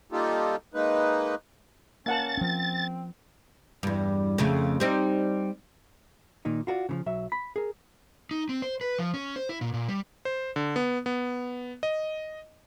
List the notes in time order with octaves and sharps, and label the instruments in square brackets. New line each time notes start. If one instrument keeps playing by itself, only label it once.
[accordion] G3 A#3 D#4 F4 G4 A4
G#3 A#3 D#4 B4
[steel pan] A#3 F#5 A5 [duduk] C#4 [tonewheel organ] A6
[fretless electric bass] F3 C#4 [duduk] C4
[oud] E2 G2
F2 C#3 A3
G3 C4 D#4
[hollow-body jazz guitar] A#2 D#3 D#4
F4 F#4 A#4 D5
C#3 E3 F3
B1 F#3 E5
B5
G#4 A#4
[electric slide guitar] D#4
C4
C5
B4
F3
C#4
C5
E4
A#2
A#2
G3
[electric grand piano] C5
D3
B3
B3
D#5